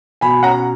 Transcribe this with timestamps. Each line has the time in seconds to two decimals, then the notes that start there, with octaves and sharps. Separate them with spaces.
0.21 B2 G#5 B5
0.43 C#4 F#5 A#5